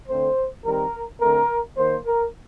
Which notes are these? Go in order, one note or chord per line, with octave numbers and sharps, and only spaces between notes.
D3 A3 C4 C5
D#3 G3 C4 A#4
D3 A3 C4 A#4
D#3 A#3 C5
A#4